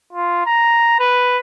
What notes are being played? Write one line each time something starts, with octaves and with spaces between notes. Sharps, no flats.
F4
A#5
B4